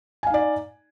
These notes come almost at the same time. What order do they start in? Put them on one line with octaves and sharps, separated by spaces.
G#5 F5 D#4 D5